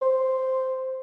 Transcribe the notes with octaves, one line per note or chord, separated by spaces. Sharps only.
C5